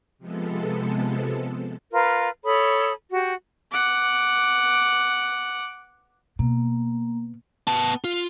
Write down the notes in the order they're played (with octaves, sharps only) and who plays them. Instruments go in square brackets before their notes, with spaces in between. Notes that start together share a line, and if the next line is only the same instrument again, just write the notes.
[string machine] C3 F3 G#3 B3 A4
[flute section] F4 A#4 B4
A4 C#5 B5 D#6
F#4 G4
[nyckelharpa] F#5 D6
[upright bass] B2 [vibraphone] A#3
[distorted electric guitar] B3 A5
F4